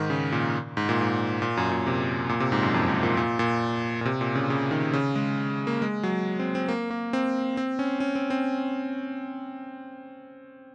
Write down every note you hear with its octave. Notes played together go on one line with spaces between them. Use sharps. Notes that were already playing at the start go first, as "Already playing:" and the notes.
Already playing: G#2 D#3
C#3
A#2
G#2
A#2
G#2
A#2
F#2
A#2
C3
A#2
C3
G#2
F#2
F2
G#2
A#2
A#2
A#2
A#2
C3
A#2
C#3
C#3
D#3
C#3
G#3
A#3
G#3
F#3
C4
C4
A#3
A#3
C4
C4
C#4
C#4
C4
C4